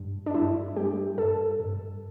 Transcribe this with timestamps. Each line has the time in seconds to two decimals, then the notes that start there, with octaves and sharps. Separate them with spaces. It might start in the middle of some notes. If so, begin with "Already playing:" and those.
Already playing: G2
0.26 D4
0.34 G2 E4
0.76 G3 G4
1.18 G2 A4
1.60 G2